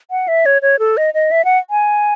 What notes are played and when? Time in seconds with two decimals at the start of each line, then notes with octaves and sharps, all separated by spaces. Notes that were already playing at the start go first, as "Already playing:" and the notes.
0.11 F#5
0.28 E5
0.46 C#5
0.62 C#5
0.79 A4
0.97 D#5
1.14 D#5
1.31 E5
1.45 F#5
1.70 G#5